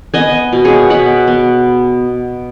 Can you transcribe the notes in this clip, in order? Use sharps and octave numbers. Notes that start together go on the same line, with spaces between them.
B3 D#5 G#5
B2
G#4 C#5
B2 F#5 B5
B3